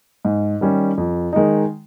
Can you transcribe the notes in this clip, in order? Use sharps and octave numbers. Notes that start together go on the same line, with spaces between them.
G#2
D#3 G3 C#4
F2
D#3 G#3 D#4